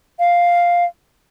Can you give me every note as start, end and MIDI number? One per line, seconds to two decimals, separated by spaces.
0.19 0.85 77